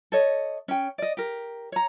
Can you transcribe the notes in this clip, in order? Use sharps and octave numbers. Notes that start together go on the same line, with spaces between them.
A4 C#5 D#5
C#4 G5
D5 D#5
G4 A#4
C#5 A#5